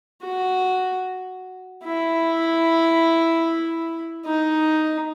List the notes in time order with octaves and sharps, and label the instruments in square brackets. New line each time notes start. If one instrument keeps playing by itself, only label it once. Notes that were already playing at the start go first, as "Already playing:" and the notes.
[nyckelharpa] F#4
E4
D#4